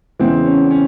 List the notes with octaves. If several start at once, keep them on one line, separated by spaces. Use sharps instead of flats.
E2 C#3 E3 G#3 C4
C#4
C#4